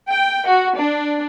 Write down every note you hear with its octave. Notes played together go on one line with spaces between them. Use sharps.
G5
F#4
D4